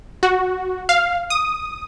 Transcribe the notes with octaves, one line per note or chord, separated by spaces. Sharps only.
F#4
F5
D#6